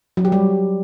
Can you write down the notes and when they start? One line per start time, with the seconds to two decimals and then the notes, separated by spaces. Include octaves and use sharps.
0.17 F#3
0.25 G4
0.32 G3